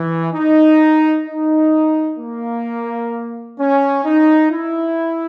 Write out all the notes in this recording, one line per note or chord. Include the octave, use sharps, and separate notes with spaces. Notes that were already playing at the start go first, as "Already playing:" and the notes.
Already playing: E3
D#4
D#4
A#3
C#4
D#4
E4